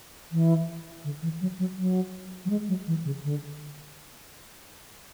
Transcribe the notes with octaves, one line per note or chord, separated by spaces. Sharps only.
E3
D3
E3
F#3
F#3
F#3
F#3
G#3
F#3
E3
C#3
D3